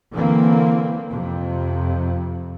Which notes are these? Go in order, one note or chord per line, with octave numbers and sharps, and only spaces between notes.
D3 E3 F#3 A#3 C4
F2 C3